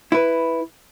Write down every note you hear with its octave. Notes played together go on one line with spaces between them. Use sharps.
E4 B4